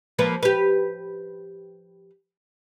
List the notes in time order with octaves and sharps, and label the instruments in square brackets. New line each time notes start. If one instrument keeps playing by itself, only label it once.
[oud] F3 A#3 B4
G4 B4